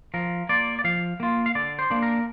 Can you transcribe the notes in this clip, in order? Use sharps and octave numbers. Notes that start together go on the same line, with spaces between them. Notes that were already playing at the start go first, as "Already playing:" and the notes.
F3 A#4
A#3 F4 D5
D5
F3 F5
A#3 F4
F5
D3 D5
C5
A#3 D4
A#4